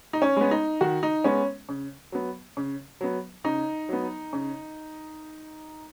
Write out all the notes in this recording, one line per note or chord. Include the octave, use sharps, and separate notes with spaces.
D#4
C#4
G#3 B3
D#4
D#3 F#4
D#4
G#3 B3 C#4
C#3
F#3 B3
C#3
F#3 B3
C#3 D#4
F#3 B3
C#3